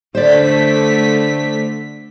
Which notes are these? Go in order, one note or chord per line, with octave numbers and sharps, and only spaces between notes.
D3 A3 C5 D5 B6